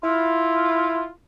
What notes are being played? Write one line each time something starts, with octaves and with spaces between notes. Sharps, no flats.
E4 F4